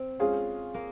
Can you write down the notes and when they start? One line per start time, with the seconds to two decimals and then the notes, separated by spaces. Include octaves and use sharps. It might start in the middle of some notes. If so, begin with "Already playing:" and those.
Already playing: C4
0.19 G#3 C#4 F4 G#4
0.74 A#3